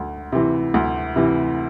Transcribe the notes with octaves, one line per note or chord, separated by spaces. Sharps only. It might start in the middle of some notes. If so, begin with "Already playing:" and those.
Already playing: D2
C3 E3
D2
C3 E3